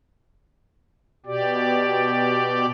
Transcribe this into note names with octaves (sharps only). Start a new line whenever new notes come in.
B2 G4 D5